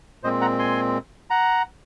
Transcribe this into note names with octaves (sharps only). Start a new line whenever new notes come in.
A#2 G#3 C4 C5 D#5
F#5 A#5
G#5 C6
F#5 A#5